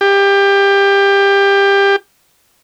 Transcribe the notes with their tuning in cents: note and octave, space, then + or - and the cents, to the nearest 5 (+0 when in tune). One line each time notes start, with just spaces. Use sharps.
G4 +20